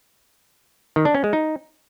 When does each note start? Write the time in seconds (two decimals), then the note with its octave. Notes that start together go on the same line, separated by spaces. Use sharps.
0.96 D#3
1.05 D4
1.15 C#4
1.24 G#3
1.33 D#4